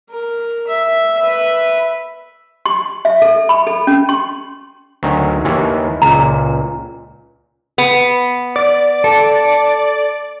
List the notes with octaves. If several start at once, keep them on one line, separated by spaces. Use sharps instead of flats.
A#4
E5
B4 E5
C6
E5
A4
B5
A4
C#4
C6
D2 D#3 F#3
D#2 D#3 E3
C#2 A#2 A#5
B3
D5
A4